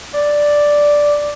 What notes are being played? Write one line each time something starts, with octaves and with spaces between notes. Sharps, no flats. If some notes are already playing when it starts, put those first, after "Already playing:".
D5